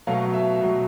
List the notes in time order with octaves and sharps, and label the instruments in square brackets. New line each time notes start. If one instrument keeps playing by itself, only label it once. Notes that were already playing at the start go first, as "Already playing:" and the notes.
[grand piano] B2 F#3 A3 F5
E5
B2 F#3 A3